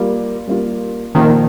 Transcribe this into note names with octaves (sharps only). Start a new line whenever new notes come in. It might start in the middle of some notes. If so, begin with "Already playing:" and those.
Already playing: G3 A#3 F4
G3 A#3 F4
A#2 D#3 F3 A#3